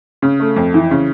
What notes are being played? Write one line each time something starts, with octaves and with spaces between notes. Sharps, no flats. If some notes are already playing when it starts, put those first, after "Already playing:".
C#3
A3
F2
E3
C#3